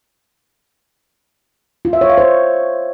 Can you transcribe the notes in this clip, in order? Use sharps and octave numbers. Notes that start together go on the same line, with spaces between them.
F4
E5
C#5
F5
C5